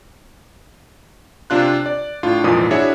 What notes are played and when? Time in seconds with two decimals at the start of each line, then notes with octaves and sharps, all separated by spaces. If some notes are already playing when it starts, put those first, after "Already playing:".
1.50 C3 D4 F4 F#6
1.86 D5
2.23 A2 D4 F4
2.44 G#1 F2 A#2 E3 F4 D#6
2.70 D4 E4 F#4 G#4 C#5 E5